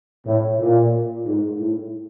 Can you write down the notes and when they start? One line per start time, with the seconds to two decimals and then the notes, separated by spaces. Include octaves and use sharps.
0.25 A2
0.59 A#2
1.25 G#2
1.59 A2